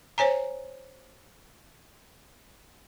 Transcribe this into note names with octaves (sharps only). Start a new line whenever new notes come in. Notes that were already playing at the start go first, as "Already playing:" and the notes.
C5 C#5 G#5 A#5